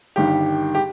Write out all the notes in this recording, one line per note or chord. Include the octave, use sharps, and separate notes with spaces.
G1 G2 D#3 G4
G4